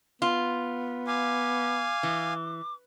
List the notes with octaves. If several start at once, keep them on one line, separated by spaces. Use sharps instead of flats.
B3 F4
F5 G#5 D6
E3